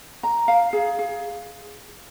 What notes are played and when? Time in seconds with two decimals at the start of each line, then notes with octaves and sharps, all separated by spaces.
0.23 A#5
0.48 F5
0.73 G#4
0.99 G#4